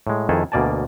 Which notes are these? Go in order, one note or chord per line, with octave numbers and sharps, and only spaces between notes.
A2 G#3
F2 D#3 E4 G#4 A4 B4
D2 B2 A#3 D5 G#5 A5